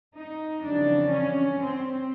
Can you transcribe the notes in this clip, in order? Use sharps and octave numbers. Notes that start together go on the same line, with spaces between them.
D#4
F2 C#3 E3 G3 D4
C#4
C4